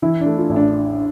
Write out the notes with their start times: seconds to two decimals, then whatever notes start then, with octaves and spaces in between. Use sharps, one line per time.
0.02 E3 E4
0.21 D4
0.26 A3
0.38 F4
0.50 A1
0.56 D4